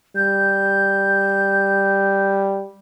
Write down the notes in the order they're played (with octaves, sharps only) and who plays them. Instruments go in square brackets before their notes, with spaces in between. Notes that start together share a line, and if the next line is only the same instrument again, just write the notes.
[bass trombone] G3 [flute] G6